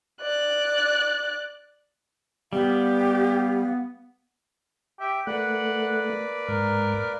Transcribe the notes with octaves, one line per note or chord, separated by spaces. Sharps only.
D5 F#6
G3 B3 G4 F5
G4 E5
A3 A#3 B4 D5 F#5
G#2 A#4